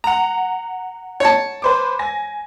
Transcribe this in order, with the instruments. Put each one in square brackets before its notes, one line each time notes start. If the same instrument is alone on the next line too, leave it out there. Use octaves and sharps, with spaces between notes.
[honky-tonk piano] F#5 A#5
[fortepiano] C#5 A5
[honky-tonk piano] B4 C5 D6
G#5 A#6